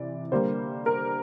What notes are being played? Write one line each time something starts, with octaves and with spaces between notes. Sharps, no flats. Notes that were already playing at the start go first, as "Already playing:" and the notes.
Already playing: C3 E3 D5
D3 G3 A#3 C5
A#4